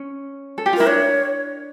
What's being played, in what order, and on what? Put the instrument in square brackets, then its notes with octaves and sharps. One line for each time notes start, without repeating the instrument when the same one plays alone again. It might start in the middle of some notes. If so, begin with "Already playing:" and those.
Already playing: [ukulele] C#4
A4
G4
F4
[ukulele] E4 [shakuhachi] A#4
[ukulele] D4 [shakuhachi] C#5